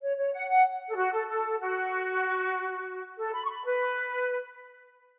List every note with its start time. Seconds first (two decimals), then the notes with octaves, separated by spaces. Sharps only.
0.02 C#5
0.17 C#5
0.33 F#5
0.49 F#5
0.88 A4
0.97 F#4
1.12 A4
1.28 A4
1.60 F#4
3.18 A4
3.34 B5
3.45 C#6
3.50 B5
3.65 B4